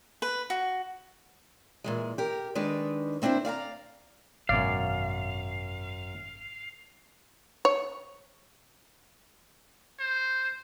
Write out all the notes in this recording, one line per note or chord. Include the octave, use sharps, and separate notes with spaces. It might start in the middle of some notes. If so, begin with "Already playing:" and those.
B4
F#4
A#2 E3 G#3
G4 A#4
D#3 G#3 D4 B4
A#3 C4 D4 E4 C5
D5 F5 G5 A#5
G#1 F#2 B2 C#5 D5 F5
C#5
C5